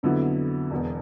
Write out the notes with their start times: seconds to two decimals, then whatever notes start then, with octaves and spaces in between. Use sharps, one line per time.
0.03 F2 D3 F#3 B3 E4
0.71 E1 E2 B2